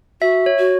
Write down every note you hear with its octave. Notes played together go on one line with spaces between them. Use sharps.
F#4 E5
C#5
F#4